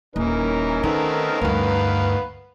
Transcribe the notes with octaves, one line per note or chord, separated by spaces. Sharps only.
D#1 E3 C#4 D#4 A#4
D#3 A3 B3 C4
D2 G2 D#3 B3 B4 F5